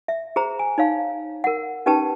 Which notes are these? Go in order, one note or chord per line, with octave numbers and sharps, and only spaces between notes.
E5
G#4 C5 A#5
G#5
D#4 C#5 F5
A#4 F#5
C#4 D#4 G4 B4 G5 A5